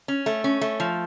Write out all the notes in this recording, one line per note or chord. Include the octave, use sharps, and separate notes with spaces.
C#4
A3
C#4
A3
F3